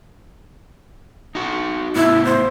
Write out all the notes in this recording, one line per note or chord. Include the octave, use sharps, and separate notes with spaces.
D#4 F#4
A2 B3 E4
C5